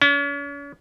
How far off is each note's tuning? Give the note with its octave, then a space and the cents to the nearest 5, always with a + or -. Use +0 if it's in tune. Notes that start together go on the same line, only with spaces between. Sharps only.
C#4 +40